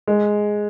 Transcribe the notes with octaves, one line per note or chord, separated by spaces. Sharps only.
G#3